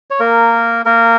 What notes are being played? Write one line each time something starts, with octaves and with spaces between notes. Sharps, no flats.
C#5
A#3 A#4
A#3 A#4